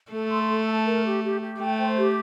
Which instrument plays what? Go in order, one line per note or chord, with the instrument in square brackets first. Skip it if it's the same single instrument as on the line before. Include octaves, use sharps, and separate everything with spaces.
[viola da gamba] A3 [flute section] A4
[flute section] C6
A4
A5
A#4
G4
G4
G4
[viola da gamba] A3 [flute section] G5
[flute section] C5
G4